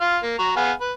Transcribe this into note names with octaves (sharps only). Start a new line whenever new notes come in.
F4 F6
A#3
F#4 A#5
B3 G#4 F5
B4